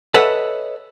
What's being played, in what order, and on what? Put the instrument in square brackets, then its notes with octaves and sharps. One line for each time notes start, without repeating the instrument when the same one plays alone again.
[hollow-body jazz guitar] A4 B4 C#5 D#5 E5 F#5